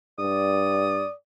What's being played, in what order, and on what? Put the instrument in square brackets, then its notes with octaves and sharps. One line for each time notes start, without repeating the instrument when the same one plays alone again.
[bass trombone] G2 [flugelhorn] D5 [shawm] D#6